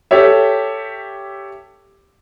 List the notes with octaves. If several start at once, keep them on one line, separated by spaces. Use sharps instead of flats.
G4 A4 C#5 E5